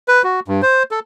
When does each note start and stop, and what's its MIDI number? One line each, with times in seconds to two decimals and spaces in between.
0.08 0.22 71
0.24 0.40 66
0.48 0.61 43
0.62 0.83 72
0.91 1.00 69